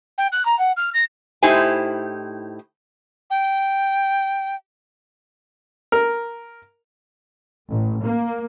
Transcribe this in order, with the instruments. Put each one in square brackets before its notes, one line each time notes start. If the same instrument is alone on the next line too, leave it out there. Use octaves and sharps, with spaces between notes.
[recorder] G5
F#6
A#5
F#5
F6
A#6
[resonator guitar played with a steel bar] A2 D#4 E4 G4 C5 G#5
[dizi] G5
[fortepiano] A#4
[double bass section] A1
A#3